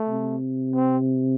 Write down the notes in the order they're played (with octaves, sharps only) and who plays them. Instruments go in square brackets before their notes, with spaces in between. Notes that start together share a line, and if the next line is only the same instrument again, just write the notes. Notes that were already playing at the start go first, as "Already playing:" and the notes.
Already playing: [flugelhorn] A3
[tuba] C3
[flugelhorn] C4